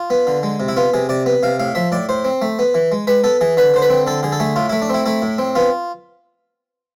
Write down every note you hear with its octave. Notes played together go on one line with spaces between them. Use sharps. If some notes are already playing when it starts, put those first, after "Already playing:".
Already playing: F4
B3
D3
G#3
C3
E4
B3 F4
C3 G#4
C3 D5
B3
C3 F5
A2 F5
F3 E5
A2 D5
A2 C5
C4
A3
B3
E3
G#3
G#3 B4
B3 A4
E3 G#4
D3 B4
D3 C5
B4
C4
D3 A4
D3 G#4
A4
A3 G#4
A2 F4
A3 E4
D4
C4 E4
A3 E4
A2
C4
B3 F4